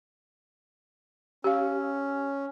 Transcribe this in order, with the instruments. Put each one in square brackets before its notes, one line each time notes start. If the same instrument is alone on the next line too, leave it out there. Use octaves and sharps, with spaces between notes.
[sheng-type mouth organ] C#4 [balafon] G4 F5